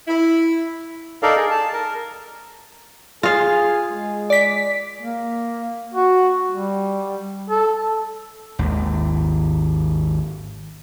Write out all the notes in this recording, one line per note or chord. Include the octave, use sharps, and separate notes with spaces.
E4
D#4 A4 A#4 D5 F5
G#4
A5
A#4
F4 G#4 F5
G#3
D5 B6
A#3
F#4
G3
A4
G#1 D#2